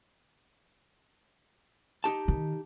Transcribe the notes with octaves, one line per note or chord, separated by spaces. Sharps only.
D#4 G4 A5
D#3